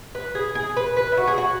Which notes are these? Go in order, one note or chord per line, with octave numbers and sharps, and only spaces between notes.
B4
G#4
G#4
B4
B4
E4
F#4
G#4
F#4